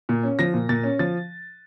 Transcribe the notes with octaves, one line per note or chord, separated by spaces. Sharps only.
A#2
C#4
F3 A#6
A#2
A#2 A6
C#4
F3 A6